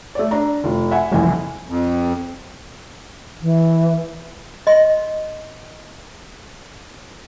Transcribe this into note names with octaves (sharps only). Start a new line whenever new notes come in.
A3 D5
D4 A#5
F1 F4
E5 F#5 G#5
F#1 C2 F2 E3 G#5
F2
E3
D#5 C6